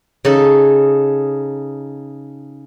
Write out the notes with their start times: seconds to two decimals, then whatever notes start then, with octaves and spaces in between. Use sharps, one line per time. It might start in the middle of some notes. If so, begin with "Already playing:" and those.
0.25 C#3 D#4 A4